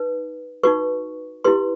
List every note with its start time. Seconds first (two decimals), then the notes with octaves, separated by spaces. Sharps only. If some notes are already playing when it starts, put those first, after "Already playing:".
Already playing: D#4 B4
0.63 D#4 F#4 B4 C#6
1.44 E4 G4 B4 C6